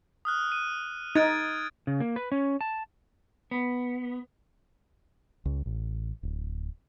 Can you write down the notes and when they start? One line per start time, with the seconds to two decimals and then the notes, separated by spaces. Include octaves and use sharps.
0.25 D#6 F6 F#6
0.52 D#7
1.15 D#4 G#6 A6 D7
1.87 C#3
2.00 A#3
2.16 B4
2.32 C#4
2.61 A5
3.51 B3
5.45 C#2
5.66 A1
6.23 D1